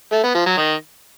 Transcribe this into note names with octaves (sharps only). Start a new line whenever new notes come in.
A3
B3
F3
F#3
D#3